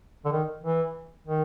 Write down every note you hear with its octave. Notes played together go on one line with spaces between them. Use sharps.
D3
D#3
E3
D#3